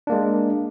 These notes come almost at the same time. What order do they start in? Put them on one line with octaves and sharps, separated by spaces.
D4 A#3 G#3